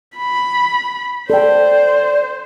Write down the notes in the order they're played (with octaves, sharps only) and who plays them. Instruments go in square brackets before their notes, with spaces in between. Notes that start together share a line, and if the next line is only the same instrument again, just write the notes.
[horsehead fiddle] B5
[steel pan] A4 G5 [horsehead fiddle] C5 [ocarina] D5